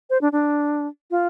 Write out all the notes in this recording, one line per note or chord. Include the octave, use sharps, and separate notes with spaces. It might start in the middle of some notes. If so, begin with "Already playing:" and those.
C5
D4
D4
F4